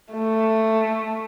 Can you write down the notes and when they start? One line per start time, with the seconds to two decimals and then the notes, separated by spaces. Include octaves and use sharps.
0.13 A3